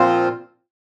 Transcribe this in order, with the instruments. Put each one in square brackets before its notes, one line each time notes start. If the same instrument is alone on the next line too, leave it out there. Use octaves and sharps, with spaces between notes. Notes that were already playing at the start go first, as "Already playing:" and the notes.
Already playing: [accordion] A#2 F3 C4 F4 C5